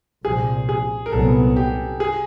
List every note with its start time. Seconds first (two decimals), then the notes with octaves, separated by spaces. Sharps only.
0.25 C2 A#2 F3 G#4
0.69 G#4
1.06 A#4
1.12 C2 A#2 F#3 B3 A4
1.56 G4
2.00 G#4